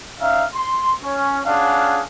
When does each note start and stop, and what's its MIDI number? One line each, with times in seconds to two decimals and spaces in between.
0.20 0.44 61
0.20 0.44 63
0.20 0.44 76
0.20 0.44 77
0.54 0.91 84
1.04 1.40 61
1.46 2.00 61
1.46 2.00 62
1.46 2.00 65
1.46 2.00 68
1.46 2.00 77
1.46 2.00 78